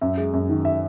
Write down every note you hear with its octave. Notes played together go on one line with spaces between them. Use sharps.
F#2 E5
G#3
F#2
D#3
E5